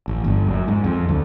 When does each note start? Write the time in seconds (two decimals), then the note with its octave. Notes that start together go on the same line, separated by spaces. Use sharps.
0.08 A1
0.24 G1
0.47 F#2
0.68 G#2
0.84 F2
1.08 D2